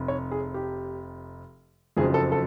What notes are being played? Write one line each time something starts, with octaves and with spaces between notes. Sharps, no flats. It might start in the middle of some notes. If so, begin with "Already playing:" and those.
Already playing: F1 C3
C#5
G#4
G4
F#1 F2 C#3 F#3 G#4
A4
A4